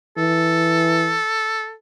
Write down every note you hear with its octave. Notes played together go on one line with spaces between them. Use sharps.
E3 A4